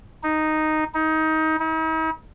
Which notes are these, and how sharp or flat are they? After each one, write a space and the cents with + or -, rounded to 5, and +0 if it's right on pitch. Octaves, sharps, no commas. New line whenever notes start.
D#4 -5
D#4 +20
D#4 +45